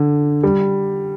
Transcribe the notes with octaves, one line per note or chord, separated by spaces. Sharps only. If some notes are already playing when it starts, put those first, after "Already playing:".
Already playing: D3
G3